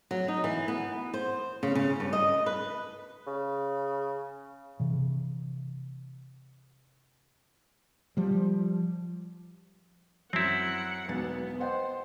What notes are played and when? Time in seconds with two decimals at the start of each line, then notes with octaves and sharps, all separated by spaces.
0.11 F#3
0.28 D#4
0.44 E3
0.68 B3
1.14 C5
1.63 C#3
1.75 C#3
2.00 G2
2.13 D#5
2.46 B4
3.27 C#3
4.80 C3 E3
8.17 F3 G3
10.33 F#2 C4 E4 F#5
11.08 E1 B1 B3 A6
11.60 C5 D#5 F#5 G5